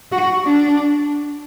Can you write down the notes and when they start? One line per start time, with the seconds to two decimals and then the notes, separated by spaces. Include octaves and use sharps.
0.12 F#4
0.44 D4